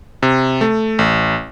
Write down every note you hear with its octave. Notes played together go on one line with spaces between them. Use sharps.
C3
A3
A1